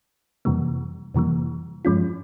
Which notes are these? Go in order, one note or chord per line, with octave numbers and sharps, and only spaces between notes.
F2 C3 E3 G3 A#3
F2 C3 E3 G3 A#3
G2 F3 G#3 C#4 F4